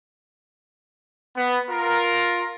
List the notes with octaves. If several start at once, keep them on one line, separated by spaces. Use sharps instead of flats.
B3
F4 A#4